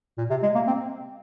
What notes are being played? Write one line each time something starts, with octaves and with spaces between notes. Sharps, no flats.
A#2
C3
G#3
A#3
C4